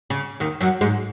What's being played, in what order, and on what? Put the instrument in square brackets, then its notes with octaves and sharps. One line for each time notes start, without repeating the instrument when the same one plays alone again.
[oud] C#3
D#2 D#3
F#2 F#3
G#2 G#3